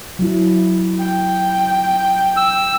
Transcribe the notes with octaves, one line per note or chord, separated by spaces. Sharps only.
F#3 E4
G5
E6